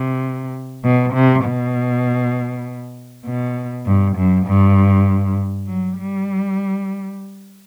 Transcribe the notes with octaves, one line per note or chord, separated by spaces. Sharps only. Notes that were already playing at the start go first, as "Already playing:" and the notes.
Already playing: C3
B2
C3
B2
B2
G2
F#2
G2
F#3
G3